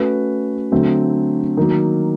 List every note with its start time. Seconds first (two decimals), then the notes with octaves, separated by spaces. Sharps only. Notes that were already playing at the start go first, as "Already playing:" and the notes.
Already playing: A3 C#4 F#4 B4
0.72 D3 F#3 A3 C4
1.57 D#3 F#3 A#3